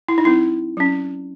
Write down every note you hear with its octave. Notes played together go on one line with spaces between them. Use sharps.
E4
D#4
F#3 C4 E4
F#3 C#4